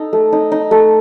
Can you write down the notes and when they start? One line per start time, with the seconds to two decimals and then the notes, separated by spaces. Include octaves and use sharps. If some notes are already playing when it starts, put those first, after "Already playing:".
Already playing: D#4 A4
0.13 A3
0.32 D#4
0.52 D#4
0.71 A3